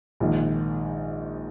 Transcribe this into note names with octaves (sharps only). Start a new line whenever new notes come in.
A#1 G#2 D#3